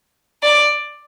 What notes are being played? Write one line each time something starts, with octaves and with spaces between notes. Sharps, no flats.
D5